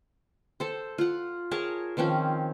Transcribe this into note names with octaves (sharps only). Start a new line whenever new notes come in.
A4 C5
F4 F#5
G#4 A#4 C#5 A5
D#3 F3 C4 C#4